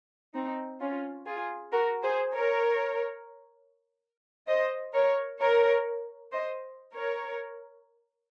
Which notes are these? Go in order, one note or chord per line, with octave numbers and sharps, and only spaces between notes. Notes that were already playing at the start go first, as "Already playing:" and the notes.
C4 D#4
C#4 F4
F4 G#4
F#4 A#4
G#4 C5
A#4 C#5
C5 D#5
A#4 C#5
A#4 C#5
C5 D#5
A#4 C#5